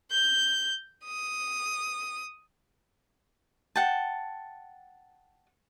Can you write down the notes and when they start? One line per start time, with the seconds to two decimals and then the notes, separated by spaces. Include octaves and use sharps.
0.11 G6
1.06 D#6
3.76 F#5 G5 A5